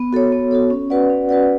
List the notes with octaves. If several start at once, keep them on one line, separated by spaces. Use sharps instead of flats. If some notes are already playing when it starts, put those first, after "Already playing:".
Already playing: B3
F#4 A4 C#5
B3
F#4 A4 C#5
C#4
F#4 B4 D5 F#5
C#4
F#4 B4 D5 F#5